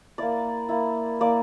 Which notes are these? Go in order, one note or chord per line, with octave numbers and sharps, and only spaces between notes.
A#3 E4 D5
A#3 E4
A#3 E4 D5